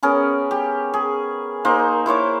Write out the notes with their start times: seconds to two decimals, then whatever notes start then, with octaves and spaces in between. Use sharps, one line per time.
0.03 B3 C#4 G#4 A#4
0.51 G4
0.94 G#4
1.65 A#3 D#4 C5
2.06 E4 C5 C#5 D6